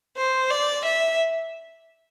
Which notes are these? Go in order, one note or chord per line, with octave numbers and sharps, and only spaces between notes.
C5
D5
E5